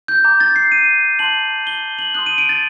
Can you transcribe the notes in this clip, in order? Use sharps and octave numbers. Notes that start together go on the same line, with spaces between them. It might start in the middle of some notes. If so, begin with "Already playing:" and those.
G6
A#5 D6 G6
A6
C7
D#7
A5 C6 F#6 F#7
G7
F#7
C6 D#6 F#6 F#7
D#7
D7
A6